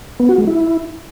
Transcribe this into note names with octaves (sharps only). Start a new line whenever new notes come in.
B3
F#4
G#3
E4